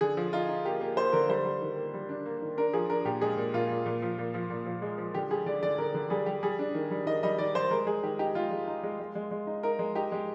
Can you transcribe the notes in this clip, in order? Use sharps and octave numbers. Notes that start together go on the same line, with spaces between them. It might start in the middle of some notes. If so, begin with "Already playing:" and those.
D3 G#4
F3
D#4 F4
D#4
A#3 G4
A#3
A#3 C5
D3 A#4
G3 C5
G3
D#3
A#3
G3
D4
A#3
D#3
D4 A#4
F3 G#4
D4 A#4
A#2 G4
G#3 G#4
A#2
A#2 F4
A#2
A#2
F3
A#2
F3
A#2
F3
G#3
F3
D3 G4
G3 G#4
D3 D5
D3 D5
D3 A#4
D3
G3 G#4
G3 G4
G3 G#4
D4
D#3
G3
D#3 D#5
G3 D#5
D#3 D5
G3 C5
G#3 A#4
G#3 G#4
D#3 G4
D#4 G4
G#3 F4
G#3
D#4
G#3
G#3
G#3
G#3
D#4
D#4 A#4
G#3
D#4 G4
G#3